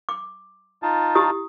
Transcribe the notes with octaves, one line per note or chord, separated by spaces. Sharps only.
D6
D#4 F4 A5
E4 G4 D#6